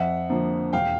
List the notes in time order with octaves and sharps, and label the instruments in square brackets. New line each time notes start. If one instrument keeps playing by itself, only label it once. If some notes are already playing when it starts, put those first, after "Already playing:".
Already playing: [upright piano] F2 E5 F#5
D3 F3 A#3
E1 F5 G5